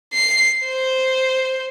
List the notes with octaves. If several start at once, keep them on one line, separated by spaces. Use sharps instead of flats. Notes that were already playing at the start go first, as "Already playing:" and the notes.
C7
C5